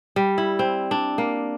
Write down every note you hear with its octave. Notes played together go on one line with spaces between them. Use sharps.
G3
E4
C4
D4
A#3